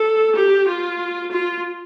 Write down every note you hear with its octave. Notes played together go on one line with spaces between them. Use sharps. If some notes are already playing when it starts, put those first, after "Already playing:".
Already playing: A4
G4
F4
F4